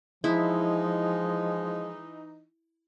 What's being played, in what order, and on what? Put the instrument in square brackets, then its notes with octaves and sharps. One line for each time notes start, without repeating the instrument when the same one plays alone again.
[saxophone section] E3 D#4 [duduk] F3 [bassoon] G#3 [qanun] E4